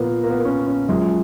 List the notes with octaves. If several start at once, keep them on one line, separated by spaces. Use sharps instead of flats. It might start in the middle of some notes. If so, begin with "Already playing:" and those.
Already playing: A#2 F3 A#3 B3
A#3
B3
A#3
C#4
C#4
F#2 F3 G#3